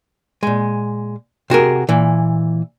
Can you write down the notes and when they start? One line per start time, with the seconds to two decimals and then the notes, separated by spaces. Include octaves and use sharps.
0.43 A#2 G#3
1.50 C3 F#4 G#4 A#4
1.89 A#2 E3